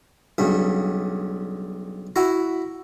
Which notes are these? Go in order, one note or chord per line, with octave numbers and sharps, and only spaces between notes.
B1 G2 C#3
E4 F#4 A#5